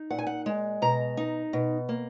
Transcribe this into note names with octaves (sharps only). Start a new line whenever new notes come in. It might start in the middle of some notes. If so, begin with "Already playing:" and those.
Already playing: D#4
A#2 F#5
G#5
F#5
G#3
B2 A#5
D#4
B2
A#3